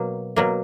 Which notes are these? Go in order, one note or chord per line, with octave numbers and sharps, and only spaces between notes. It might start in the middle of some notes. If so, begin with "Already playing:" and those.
Already playing: B2 F#3 A#3
B2 F#3 A#3